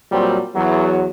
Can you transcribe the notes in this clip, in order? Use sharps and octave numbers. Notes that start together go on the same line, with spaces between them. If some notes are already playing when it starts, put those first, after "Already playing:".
A#2 F#3 G3 C4
E2 F#3